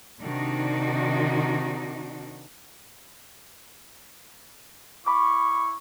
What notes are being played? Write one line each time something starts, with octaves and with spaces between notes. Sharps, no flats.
C3 D#3 D4 D#4 F#4
E4 B5 C#6 D6